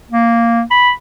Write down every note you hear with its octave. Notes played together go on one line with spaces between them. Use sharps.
A#3
B5